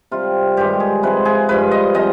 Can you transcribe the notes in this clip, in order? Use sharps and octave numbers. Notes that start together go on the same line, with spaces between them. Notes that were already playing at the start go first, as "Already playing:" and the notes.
C3 G3 F4
G2 D#3 G#3 G4
G#4
C3 F3 G#3 B4
G#4
G2 F3 G#3 B4
D#5
C3 F3 G#3 D#5